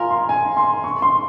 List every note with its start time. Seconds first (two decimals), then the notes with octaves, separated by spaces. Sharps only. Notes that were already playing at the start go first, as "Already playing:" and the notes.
Already playing: F4 A#4 G#5 A#5
0.11 C6
0.29 G#5
0.57 C6
0.84 C#6
1.02 C6